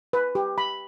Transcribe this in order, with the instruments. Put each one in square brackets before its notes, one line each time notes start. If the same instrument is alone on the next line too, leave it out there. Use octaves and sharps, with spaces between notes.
[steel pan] B4
G4
B5